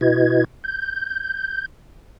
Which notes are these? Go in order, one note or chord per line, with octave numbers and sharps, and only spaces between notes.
B2 E4 F#4 B4 D#5 G#6
G6